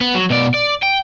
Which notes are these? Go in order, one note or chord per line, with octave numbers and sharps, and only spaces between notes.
B3
F#3
B2 D5
D5
G5